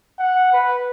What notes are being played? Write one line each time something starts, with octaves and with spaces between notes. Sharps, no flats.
F#5
B4